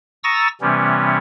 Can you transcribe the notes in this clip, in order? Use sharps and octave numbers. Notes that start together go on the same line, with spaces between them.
A#5 C#6 D#6 E6 A6 A#6
C3 E3 G3 B3 C#4